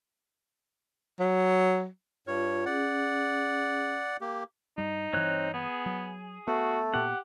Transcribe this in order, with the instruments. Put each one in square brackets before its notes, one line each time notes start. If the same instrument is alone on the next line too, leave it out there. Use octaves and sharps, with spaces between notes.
[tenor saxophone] F#3
[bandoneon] G2 C#5 [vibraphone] F4
[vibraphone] C#4 G#4 [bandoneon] D5 F#5
[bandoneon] A#3 G4
[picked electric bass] G2 G3 [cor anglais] D#4
[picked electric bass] G2 E3 [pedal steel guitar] C4 C#5 F#6
[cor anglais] B3 [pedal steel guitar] G#4
[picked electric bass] F#3
[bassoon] A3 [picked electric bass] B3 [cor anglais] F#4
[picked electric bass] A#2 B3 [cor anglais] G4 [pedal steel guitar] F#5